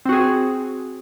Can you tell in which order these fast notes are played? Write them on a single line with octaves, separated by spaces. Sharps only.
C4 F#4 G#4